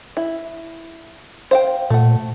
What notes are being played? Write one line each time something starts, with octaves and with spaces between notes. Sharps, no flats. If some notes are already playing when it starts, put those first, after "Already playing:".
E4
C5 F5 G5
A#2 A3 F#5